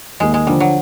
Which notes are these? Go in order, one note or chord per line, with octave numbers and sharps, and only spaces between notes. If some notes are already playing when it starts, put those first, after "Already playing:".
D#2 G#3
G#3
D3 F3 G3
F#3